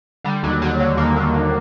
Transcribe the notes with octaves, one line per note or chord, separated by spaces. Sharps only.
D3 G3
D#2 F#3
D#2 F#3
D3
D#2 A#3
D3
D#2